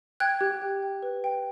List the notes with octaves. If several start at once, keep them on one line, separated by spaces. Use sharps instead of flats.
G5 F#6 G#6
G4
G5
G5
B4
G5